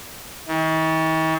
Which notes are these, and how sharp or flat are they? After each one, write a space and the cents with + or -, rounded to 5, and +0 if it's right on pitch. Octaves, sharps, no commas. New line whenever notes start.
D#3 +45